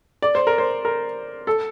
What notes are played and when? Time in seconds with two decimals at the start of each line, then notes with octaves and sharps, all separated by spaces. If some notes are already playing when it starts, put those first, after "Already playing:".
0.22 D5
0.35 C5
0.47 A#4
0.58 C5
0.85 A#4
1.47 A4